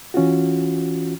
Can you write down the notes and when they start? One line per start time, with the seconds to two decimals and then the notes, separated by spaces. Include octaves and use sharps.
0.14 E3 C#4 F4 F#4